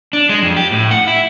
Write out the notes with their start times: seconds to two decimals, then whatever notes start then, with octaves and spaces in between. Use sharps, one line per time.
0.13 D4
0.29 G#3
0.43 F2
0.57 G4
0.72 A2
0.91 F#5
1.07 E4